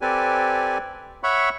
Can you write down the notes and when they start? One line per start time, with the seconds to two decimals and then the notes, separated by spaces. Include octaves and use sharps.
0.01 C4 G4 A4 B4 D5 G#5
1.23 C#5 E5 F#5 B5 C#6